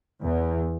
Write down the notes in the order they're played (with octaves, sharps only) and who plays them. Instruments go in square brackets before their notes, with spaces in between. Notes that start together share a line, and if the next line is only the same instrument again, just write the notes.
[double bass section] E2